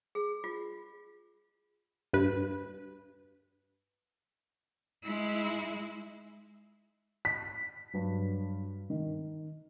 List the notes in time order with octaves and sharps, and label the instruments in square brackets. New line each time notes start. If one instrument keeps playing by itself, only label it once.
[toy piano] G#4
F4
[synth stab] G2 B4
[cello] G#3 E4
[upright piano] B6
[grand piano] G2 F#3
D#3